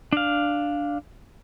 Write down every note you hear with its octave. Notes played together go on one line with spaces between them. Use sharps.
D4 F5